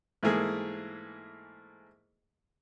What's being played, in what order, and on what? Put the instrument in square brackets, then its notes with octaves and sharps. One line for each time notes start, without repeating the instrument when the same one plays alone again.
[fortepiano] G#2 E3 A3 A#3 G#4